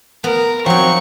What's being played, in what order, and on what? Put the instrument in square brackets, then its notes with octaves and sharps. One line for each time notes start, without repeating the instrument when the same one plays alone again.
[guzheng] B3 [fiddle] A#4
[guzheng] F3 D#4 [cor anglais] F#3 [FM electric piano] C4 [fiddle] C#6